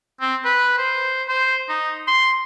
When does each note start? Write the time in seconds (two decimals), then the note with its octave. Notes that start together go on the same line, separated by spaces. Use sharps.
0.21 C4
0.45 B4
0.78 C5
1.28 C5
1.69 D#4
2.08 C6